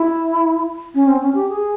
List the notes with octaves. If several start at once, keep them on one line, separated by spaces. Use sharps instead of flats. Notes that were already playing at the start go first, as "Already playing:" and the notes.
Already playing: E4
C#4
C4
C#4
G4
G#4